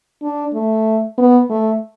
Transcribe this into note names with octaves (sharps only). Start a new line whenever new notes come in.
D4
A3
B3
A3